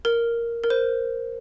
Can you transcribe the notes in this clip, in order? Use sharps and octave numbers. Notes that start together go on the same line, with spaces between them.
A#4
A#4
C5